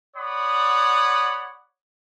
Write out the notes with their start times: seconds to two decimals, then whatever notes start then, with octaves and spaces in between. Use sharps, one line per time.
0.17 C#5 D5 F#5 B5 D#6